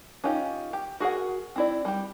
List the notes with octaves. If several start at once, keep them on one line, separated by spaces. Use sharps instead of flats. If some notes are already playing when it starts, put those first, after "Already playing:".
C#4 D#4 F4 G4
G4
F#4 G#4 A#4 F#5
C4 E4 D5
G3 G4